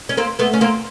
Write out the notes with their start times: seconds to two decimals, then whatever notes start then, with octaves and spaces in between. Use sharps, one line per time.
0.09 C#4
0.17 A#3 C4
0.39 A3 B3
0.53 C#4
0.61 A#3 C4